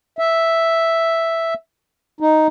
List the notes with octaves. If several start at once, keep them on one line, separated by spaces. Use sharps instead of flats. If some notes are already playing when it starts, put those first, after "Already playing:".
E5
D#4